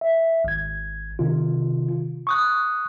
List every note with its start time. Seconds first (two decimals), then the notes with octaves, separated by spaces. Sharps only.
0.01 E5
0.44 G#1 G#6
1.19 C3 D#3 F4
2.27 C#6 D#6 F#6